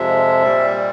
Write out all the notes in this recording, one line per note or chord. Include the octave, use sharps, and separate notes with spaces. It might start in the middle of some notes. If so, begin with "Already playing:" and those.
Already playing: F2 C3 F3 G#3 E5
A#2 G3